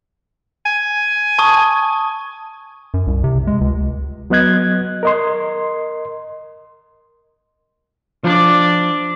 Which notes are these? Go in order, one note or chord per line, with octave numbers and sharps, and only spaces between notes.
G#5
A5 C#6 D#6
F#2
C2
C3
G#3
C#2
F#3 B3 D#5 F#6 G#6
A#4 D#5 C6
F3 D4 D5